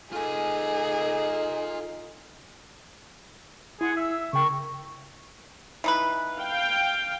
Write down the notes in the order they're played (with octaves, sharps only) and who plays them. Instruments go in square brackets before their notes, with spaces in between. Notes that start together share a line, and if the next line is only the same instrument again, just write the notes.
[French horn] D#4 [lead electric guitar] F4 G#5 [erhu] G#4 [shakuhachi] A4
[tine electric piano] E4 [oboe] G#4 [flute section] F#5 C6
[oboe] E5 [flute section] E6
[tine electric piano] C#3 G5 [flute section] A#4 C#6
[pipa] E3 D#4 B4
[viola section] F5 G5